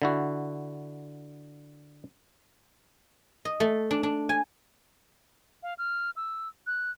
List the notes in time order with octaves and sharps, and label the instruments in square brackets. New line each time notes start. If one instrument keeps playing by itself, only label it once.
[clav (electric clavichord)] D3 E4 F#4
[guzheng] D#5
A3
D4
D4
G#5
[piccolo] F5
F6
E6
F#6